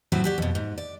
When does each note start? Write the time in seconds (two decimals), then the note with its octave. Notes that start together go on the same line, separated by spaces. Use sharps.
0.12 A2 F#3 C4 E4 F#4
0.24 F#4 G4 D5
0.38 F2 B2
0.55 G#2
0.78 D5